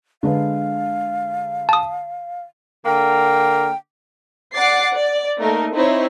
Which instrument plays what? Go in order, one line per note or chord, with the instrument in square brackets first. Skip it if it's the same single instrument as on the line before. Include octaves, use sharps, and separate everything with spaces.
[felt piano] D3 G#3 B4 [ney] F5
[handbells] A5 D#6
[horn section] D3 A#3 A#4 [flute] G5
[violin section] D5 F#5 D6 A6 C7
D5
A3 A#3 D#4 A#4
C4 D#4 E4 C5 C#5